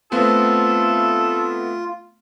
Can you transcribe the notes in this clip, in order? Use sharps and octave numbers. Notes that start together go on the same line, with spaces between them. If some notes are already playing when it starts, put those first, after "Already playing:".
A3 B3 C4 F4 A4